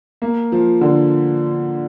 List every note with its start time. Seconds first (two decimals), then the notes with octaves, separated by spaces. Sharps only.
0.22 A#3
0.52 F3
0.81 D3